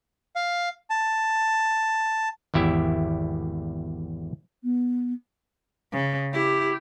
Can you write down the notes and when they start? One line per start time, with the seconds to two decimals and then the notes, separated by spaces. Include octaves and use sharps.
0.36 F5
0.90 A5
2.54 G#1 E2 E4 G4 E5
4.64 B3
5.92 C#3
6.34 E4 G4